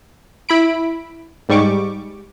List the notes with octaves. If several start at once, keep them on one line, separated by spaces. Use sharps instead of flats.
E4 B5 D7
G#2 G3 C#6 D6